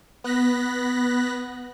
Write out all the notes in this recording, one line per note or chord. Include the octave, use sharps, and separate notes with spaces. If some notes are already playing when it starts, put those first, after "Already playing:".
B3 F#6 A#6 B6